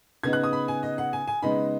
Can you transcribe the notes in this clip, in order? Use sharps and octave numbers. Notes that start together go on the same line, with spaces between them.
C#3 B3 D#4 G#6
F#6
D#6
B5
G#5
D#5
F#5
G#5
G#5
C#3 G#3 B3 D#4 B5